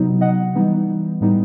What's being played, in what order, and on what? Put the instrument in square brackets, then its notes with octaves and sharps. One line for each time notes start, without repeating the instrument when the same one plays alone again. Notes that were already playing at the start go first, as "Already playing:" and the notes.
Already playing: [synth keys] C3 F#3 B3 D#4
D#5 F#5
E3 G3 B3 D#4
A2 G3 B3 D#4